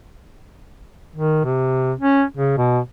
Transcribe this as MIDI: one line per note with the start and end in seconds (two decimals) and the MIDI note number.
1.16 1.43 51
1.45 1.92 48
1.99 2.24 61
2.37 2.54 49
2.58 2.79 47